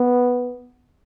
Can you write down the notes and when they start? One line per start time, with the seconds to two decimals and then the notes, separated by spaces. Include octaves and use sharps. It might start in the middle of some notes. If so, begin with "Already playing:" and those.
Already playing: B3